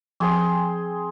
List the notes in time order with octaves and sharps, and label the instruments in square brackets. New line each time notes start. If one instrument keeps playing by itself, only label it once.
[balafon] F3 [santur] C4 G#4 C6